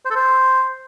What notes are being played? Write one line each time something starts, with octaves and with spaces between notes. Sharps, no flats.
C5
A4
C5